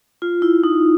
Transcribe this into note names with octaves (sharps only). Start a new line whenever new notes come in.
F4
E4
D#4